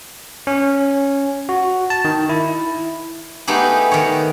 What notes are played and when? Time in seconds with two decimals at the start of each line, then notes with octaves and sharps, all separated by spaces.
0.47 C#4
1.49 F#4
1.90 A5
2.05 D#3
2.29 E4
3.47 A3 B3 D#4 G4 G#4
3.92 D#3 C#5